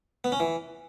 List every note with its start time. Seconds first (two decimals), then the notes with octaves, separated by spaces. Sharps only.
0.24 B3
0.32 C#4
0.40 E3